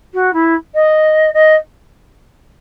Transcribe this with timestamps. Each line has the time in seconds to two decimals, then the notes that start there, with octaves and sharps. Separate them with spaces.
0.13 F#4
0.33 E4
0.74 D#5
1.34 D#5